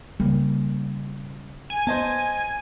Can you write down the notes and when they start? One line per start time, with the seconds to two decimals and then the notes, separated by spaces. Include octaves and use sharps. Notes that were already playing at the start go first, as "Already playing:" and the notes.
0.20 C#3 G3 A#3
1.70 G#5
1.87 B3 C5 D#5 A5